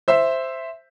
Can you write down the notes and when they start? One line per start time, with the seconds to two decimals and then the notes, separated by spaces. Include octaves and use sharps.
0.08 C5 E5